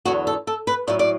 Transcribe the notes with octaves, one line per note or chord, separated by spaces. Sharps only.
E2 D3 F#3 F#4
A4
A4
B4
A2 F#3 D5
D5